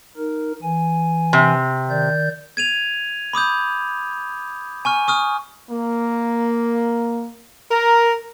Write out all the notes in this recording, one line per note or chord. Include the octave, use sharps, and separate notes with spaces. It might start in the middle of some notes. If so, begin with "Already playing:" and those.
D#4 A#4
E3 G#5
C3
D#3 D5 G6
G#6 D#7 F7
B5 D6 D#6 G6
G#5 C#6 F6
C#6 D#6 F6
A#3
A#4